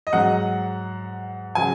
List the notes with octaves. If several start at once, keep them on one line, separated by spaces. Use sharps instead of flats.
D#5
G#2 F#3 F#5
C#3 F#3 G#5